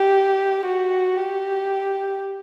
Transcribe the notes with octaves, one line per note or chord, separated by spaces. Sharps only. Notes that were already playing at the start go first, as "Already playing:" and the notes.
Already playing: G4
F#4
G4